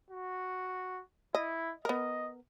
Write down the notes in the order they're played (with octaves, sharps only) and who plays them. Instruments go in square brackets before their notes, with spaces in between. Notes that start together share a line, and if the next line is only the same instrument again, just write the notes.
[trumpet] F#4
[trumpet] E4 [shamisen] D#5
[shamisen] B3 A#4 [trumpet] D#5